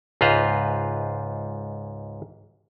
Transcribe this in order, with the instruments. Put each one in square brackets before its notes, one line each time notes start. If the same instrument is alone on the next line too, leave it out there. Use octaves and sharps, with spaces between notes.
[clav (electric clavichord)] C#2 G#2 F4 B4 C5 A#5